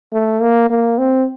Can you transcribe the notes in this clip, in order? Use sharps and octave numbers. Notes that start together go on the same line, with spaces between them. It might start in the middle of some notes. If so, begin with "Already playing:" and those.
A3
A#3
A#3
C4